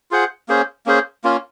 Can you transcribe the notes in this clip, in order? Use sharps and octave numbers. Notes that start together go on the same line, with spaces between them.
F4 G#4 C5 F#5
A#3 C#4 G#4 C5
A#3 C#4 G#4 C5
A#3 C#4 F4